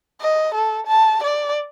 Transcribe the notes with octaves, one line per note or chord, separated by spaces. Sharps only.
D#5
A4
A5
D5